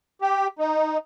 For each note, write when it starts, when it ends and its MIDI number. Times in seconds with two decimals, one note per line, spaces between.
0.21 0.47 67
0.59 0.98 63